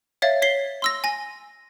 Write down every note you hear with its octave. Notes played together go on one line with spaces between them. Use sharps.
C#5 E5 F5 A6
C#5 B6 C7 G7
C6 E6 A#6
G#5 A#6